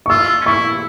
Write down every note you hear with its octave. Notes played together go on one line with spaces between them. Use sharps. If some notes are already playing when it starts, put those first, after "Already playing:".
C#6
F4 E6
C#4
E4 C#6